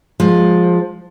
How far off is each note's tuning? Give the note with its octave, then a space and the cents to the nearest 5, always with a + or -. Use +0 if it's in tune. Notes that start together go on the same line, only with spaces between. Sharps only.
F3 +15 G#3 +0